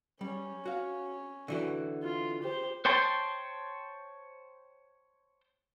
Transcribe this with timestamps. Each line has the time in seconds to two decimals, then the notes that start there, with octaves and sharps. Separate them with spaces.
0.21 G3 C#4
0.66 F#4 F5
1.48 D3 E3 F#4
2.03 F4
2.42 G4 C5
2.85 C5 C#5 G5 A5 C6